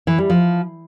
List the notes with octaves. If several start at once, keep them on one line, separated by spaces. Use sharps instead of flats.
E3
G3
F3